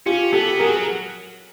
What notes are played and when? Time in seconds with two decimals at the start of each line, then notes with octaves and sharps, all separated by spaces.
0.06 C#4 F4 G4
0.32 B3 G4 A4
0.59 F#3 G#4 A#4